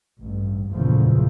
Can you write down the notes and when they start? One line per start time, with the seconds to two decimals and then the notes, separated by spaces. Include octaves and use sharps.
0.18 A1 G2
0.72 F#1 E2 A#2 C#3 F3 A3